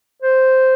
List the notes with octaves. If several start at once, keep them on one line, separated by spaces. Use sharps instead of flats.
C5